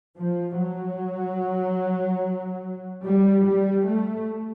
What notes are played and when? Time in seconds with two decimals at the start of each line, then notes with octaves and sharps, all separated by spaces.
0.16 F3
0.58 F#3
3.05 G3
3.45 G3
3.86 A3